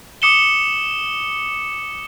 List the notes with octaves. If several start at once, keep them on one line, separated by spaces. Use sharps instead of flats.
D6 D#6 C#7 E7 G7